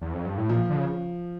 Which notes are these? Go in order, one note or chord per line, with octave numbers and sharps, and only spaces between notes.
E2
F2
G2
A2
A#2 F3
D3
C#3